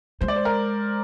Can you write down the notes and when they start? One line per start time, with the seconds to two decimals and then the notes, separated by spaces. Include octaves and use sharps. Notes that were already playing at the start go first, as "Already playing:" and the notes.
0.21 G#3 C5
0.28 D5
0.36 C5
0.45 A#4